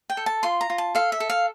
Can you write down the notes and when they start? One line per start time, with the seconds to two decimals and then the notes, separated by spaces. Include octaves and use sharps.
0.10 G5
0.17 A4
0.26 A5
0.43 F4 C6
0.61 A#5
0.70 F4
0.78 A5
0.95 A4 F5
1.12 E5
1.20 A4
1.30 F5